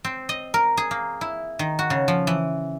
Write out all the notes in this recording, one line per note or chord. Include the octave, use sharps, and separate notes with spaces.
C4
D#5
A#4
G#4
A#3
E4
D#3
F#4
C#3
F3
E3